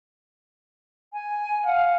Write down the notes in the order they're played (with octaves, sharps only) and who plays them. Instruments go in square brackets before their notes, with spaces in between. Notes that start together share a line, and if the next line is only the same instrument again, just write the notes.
[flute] G#5
[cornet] F5 [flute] F#5